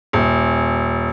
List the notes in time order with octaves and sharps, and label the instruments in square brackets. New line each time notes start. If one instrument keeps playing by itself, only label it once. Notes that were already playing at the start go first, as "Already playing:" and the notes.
[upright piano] D#1